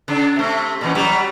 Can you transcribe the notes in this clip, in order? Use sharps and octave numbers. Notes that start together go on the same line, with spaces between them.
C#3 D4
C3 A3
A#2 E3 C#4
F#3 G3